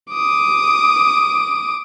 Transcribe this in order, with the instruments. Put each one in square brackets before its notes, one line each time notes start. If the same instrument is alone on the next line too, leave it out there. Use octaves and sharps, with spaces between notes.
[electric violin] D6 D#6